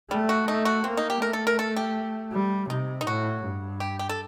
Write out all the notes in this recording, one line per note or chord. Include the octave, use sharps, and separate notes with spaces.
G3 A3
F#4
A3 D#4
F#4
A#3 C4
D#4
G4
A3 A#4
A4
A#4
A4
G4
G3
C3 D#4
D#4
A2 F#4
G2
G4
G4
A4